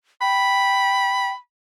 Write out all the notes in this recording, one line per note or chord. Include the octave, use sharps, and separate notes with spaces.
G5 B5